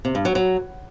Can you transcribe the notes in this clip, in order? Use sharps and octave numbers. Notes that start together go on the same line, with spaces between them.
C3
G2
F#3
F#3